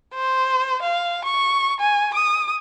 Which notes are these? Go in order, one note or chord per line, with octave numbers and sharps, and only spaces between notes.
C5
F5
C#6
G#5
D#6